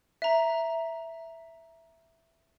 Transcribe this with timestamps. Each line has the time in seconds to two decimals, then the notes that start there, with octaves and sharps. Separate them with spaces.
0.22 E5 A#5